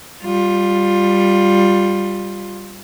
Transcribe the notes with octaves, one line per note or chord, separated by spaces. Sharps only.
G3 F4